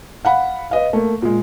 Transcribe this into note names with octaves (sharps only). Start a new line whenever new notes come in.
F5 F#5 B5
B4 D#5 F5
A3 A#3
A#2 G#3